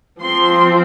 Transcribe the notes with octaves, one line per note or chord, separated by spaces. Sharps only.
F3 C4 C6